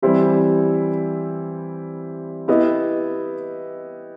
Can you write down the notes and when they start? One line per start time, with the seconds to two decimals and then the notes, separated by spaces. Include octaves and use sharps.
0.02 E3 G3 C4 E4 G4
2.48 B3 E4 G4 D#5